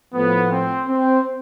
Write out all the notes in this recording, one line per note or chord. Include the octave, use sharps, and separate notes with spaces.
A2 F3 A3 B3
C4
C4